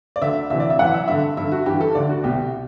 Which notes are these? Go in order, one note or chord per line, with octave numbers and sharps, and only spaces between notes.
D5
D2 D3 E5
D2 C3 E3 E5
D5
E5
F#2 E3 F#5
E5
G2 D3 E5
G2 D3 E5
F#4
G2 E3 G4
A4
D2 D3 D5
F#4
C2 B2 G4